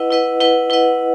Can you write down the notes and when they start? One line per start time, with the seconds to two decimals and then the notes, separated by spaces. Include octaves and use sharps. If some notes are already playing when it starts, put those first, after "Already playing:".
Already playing: E4 B4 D#5 F#5
0.11 E4 B4 D#5 F#5
0.40 E4 B4 D#5 F#5
0.70 E4 B4 D#5 F#5